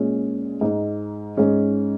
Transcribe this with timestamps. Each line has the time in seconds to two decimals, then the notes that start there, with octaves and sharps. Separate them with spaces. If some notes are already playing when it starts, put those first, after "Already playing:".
Already playing: A#2 G#3 C#4
0.61 G#2 G#3 D#4
1.37 G#2 G#3 C#4